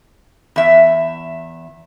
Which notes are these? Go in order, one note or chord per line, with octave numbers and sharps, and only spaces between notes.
E2 E5